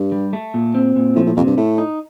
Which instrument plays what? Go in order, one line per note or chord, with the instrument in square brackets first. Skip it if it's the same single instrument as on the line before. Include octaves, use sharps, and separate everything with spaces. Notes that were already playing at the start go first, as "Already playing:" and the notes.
Already playing: [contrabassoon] G2
[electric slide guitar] G3
A3
A#2
C4
A#2
[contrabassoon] A2 [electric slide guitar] F3
[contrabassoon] A2
[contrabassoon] F2 [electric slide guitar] C3
[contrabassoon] G2
[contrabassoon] A2 [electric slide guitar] A3
[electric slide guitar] D#4